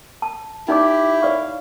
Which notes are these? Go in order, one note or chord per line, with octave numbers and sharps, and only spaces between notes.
A5
D#4 E4 G4 D5 D6
C#5 D5 F5 C#6